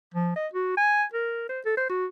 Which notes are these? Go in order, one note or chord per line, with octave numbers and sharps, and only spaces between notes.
F3
D#5
F#4
G#5
A#4
C5
A4
C5
F#4